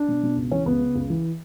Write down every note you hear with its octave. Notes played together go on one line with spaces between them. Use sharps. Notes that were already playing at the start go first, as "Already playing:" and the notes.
Already playing: D4
B2
B2
C#2
E3 C#4
C#2 B3
C#3
C#2
E3